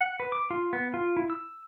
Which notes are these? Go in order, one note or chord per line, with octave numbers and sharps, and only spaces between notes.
F#5
B4
D6
F4
B3
F4
E4
E6